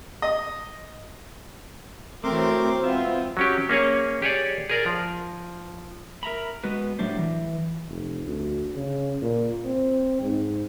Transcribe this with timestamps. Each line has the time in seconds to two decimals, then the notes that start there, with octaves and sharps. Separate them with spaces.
0.22 D#5
2.24 E3 F#3 A3 C4 A#4 C6 D6
2.84 G#3 B3 F4 E5
3.37 F#3 C#4 G4
3.69 A#3 C#4 G#4 C#5
4.22 G4 G#4 C#5 D5
4.70 G#4 A#4 D5
4.86 F3
6.23 A#4 E5 A#5 B5
6.64 G#3 B3 F#4 B4
6.99 A2 F#3 G3 A3 D4 C5
7.19 E3
7.88 F1
8.26 D2
8.75 C#3
9.21 A#2
9.65 C4
10.21 G#2